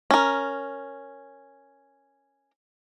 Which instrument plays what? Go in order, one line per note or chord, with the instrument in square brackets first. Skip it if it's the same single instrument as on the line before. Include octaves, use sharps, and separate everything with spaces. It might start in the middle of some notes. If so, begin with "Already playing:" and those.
[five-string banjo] C#4 A#4